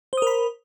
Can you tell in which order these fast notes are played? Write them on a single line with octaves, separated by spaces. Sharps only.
C5 D#6 A#4 B5